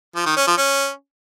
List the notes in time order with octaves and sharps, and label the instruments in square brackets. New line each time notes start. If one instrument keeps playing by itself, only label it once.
[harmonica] F3
D#3
C#4
F3
C#4